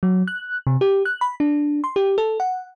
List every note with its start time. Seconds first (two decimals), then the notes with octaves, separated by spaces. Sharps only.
0.03 F#3
0.28 F#6
0.67 C3
0.81 G4
1.05 F#6
1.21 B5
1.40 D4
1.84 C6
1.96 G4
2.18 A4
2.40 F#5